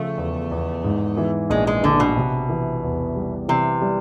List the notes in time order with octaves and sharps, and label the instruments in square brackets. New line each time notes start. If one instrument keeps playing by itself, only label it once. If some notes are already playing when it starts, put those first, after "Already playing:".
Already playing: [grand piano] C#3 F3 [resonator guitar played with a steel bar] A3
[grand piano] E2
E2
G#2
E3
[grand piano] A#1 [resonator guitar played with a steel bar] G#3
[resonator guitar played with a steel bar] G#3
[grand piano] A#1 [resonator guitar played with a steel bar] D3
[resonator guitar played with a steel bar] B2
[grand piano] C3
E3
E2
G3
[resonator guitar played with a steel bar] C3 [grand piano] E3
[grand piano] G3